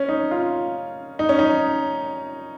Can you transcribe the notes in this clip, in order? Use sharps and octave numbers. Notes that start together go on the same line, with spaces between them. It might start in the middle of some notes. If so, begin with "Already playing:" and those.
Already playing: C#4
D#4
F4
D#4
C#4
D#4